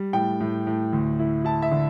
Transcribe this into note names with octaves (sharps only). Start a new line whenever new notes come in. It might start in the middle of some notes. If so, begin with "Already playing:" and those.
Already playing: G3
A2 G5
A2
A2
D2
E4
E4 A5
E5
D3